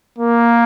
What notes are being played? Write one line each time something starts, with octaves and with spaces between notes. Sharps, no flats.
A#3